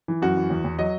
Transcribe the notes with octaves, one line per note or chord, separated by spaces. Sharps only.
E3
F#2 F#4
E3
E2
E2
F#3 D#5